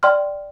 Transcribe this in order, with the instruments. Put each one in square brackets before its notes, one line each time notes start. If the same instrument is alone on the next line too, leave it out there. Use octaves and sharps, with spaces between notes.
[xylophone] D5 G5 C6 F6